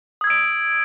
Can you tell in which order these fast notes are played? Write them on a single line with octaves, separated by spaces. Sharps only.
D#6 G#6 E6 D7